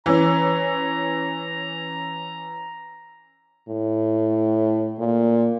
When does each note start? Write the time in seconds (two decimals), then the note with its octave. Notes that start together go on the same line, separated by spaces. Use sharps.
0.06 E3 C#4 A#5
3.68 A2
4.99 A#2